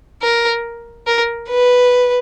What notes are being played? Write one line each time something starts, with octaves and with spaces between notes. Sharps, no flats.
A#4
A#4
B4